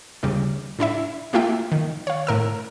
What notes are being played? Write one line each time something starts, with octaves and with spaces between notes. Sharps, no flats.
G1 D#2 C#3 G3
A2 D4 E4 E5
A3 A#3 E4 F4 E5 G5
D#3
C#5 F5
A2 A#4 E6